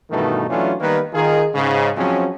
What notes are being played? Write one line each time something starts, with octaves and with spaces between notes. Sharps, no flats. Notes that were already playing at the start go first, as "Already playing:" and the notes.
G2 B2 D#3 E3 A3 D#4
E3 F#3 A3 C#4 D4 F4
D#3 G3 A#3 B3 B4
D#3 F4 G#4
G#2 C#3
F3 F#3 G#3 C4 C#4